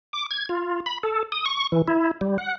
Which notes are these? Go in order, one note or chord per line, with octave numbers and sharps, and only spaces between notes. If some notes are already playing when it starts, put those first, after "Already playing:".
D6
G#6
F4
B5
A4
D#6
C#6
E3
E4
G3
F#5